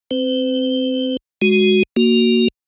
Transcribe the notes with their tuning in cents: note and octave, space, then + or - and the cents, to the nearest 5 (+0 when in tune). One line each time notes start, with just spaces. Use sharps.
C4 +0 C5 -45
G#3 +0 F#4 +0
A#3 +0 F#4 +0